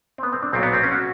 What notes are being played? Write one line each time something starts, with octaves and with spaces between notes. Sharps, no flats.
C4
B3
C4
D4
B1 A#2 F#3 B3 C4
B3
C4
C#4
F#4